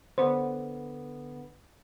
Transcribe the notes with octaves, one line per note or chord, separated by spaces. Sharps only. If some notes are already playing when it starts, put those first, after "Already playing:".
D3 B3 C5